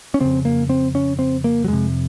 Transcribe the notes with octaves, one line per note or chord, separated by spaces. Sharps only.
C#4
F2 C#3 C4
A#3
C4
C#4
C4
A#3
F#3
F2 C3 G#3